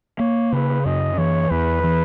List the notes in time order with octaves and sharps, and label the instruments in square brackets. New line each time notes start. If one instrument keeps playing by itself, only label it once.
[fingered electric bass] A#3 [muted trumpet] C#5
[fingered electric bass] C#3 [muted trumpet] B4
[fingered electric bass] F#2 [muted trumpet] D#5
[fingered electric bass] E3 [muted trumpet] C#5
[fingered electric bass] E2 [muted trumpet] B4
[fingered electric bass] E3